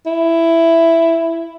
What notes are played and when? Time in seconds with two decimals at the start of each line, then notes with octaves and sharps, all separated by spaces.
0.06 E4